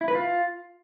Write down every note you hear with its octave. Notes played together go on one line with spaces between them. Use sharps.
E4
B4
F4